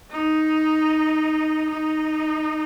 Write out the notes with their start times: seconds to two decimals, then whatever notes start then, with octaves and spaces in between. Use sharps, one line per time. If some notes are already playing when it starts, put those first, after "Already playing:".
0.11 D#4
1.70 D#4